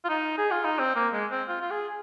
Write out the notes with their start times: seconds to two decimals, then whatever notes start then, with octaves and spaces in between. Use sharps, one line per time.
0.04 F4
0.09 D#4
0.38 G#4
0.51 F4
0.65 D#4
0.79 C4
0.96 A#3
1.13 G#3
1.31 C4
1.48 F4
1.61 F4
1.70 G#4